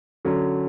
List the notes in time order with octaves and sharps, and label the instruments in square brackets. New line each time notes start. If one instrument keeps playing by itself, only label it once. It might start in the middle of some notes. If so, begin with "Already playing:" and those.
[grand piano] D3 F#3 C#4